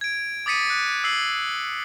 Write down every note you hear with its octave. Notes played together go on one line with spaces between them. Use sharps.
G#6 D7
D6 D#6 A6 B6 C#7 D#7
F#6
E6 C7 F#7